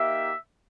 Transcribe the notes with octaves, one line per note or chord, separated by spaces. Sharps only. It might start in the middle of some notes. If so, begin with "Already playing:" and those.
Already playing: A#3 D#4 G4 E5